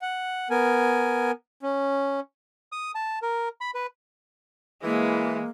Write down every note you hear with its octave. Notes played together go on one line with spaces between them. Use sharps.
F#5
B3 A#4 G#5
C#4
D#6
A5
A#4
B5
B4
E3 G#3 A#3